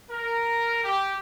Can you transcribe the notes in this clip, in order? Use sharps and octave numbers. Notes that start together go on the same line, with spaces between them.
A#4
G4